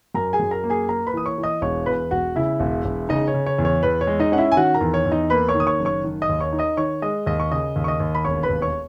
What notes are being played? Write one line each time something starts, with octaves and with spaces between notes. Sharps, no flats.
F#2 A#4 A#5
G#4 G#5
F#2
A#4 A#5
A#3
G#4 G#5
A#3 A#4 A#5
B4 B5
E3 D#6
C#5 C#6
E3
D#5 D#6
E1 C#5 C#6
E2 B4 B5
E1 F#4 F#5
C#3 E4 E5
E1
E1
C#3 D#4 D#5
C#5
C#3
C#5
E2
C#5
E2 B4
C#5
G#3
D#4 D#5
C#4 F#5
E4 E5
G#5
D#3 F#4 F#5
A#4 A#5
E2
C#5
E2
D#4 D#5
A#3 B4 B5
C#5 C#6
D#3
D#6
C#5 C#6
F#1
C#5 C#6
D#3
D#5 D#6
D#2
C#5 C#6
D#4
D#5 D#6
D#3 C#5 C#6
G#3 D#5 D#6
D#2 D#5 D#6
C#6
C#3 D#5 D#6
D#2
C#6
D#5 D#6
D#2
B5
E1 C#5 C#6
B4 B5
D#2
C#5 C#6